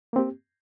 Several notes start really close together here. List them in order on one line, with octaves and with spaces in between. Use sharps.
A#3 C4 G4